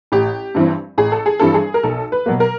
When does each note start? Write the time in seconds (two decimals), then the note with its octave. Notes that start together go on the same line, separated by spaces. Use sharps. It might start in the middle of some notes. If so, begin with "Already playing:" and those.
0.12 A1 G4
0.55 G2 E3 G3 C4
0.98 A1 G#4
1.12 A4
1.26 G#4
1.40 G2 E3 G3 C4 A4
1.54 G#4
1.74 A#4
1.83 B1 A4
2.12 B4
2.26 B2 F#3 A#3
2.40 A#4